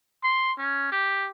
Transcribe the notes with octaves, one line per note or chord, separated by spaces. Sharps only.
C6
C#4
G4